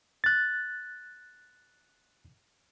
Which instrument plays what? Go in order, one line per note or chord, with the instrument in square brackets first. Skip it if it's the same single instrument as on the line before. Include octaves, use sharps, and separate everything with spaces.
[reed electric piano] F#6 A6